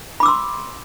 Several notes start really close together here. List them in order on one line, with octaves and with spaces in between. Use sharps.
B5 D6 E6 C6